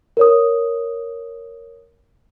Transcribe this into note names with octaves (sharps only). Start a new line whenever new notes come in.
A#4 C#5 D#6